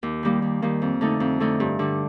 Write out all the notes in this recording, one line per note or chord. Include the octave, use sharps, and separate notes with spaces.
D#2
D#3 G3 A#3
D#2
D#3 G3 A#3
F2
D3 A3 D#4
F2
D3 A3 D#4
G2
D3 G3